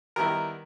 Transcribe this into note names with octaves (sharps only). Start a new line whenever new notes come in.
D#3 G3 B3 E4 A#4